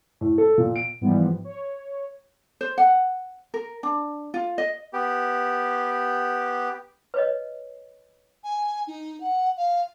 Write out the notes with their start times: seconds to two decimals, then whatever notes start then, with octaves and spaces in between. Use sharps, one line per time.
0.21 A2
0.38 A4
0.58 A#2
0.76 D7
1.01 G#2 E3 F3 G3 B3
1.45 C#5
2.61 C5
2.78 F#5
3.54 A#4
3.83 D4
4.34 F4
4.58 D#5
4.93 B3 G4
7.14 B4 C#5 D#5
8.44 G#5
8.87 D#4
9.21 F#5
9.57 F5